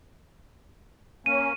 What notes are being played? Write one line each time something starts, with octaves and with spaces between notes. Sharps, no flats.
A#3 C#4 D#7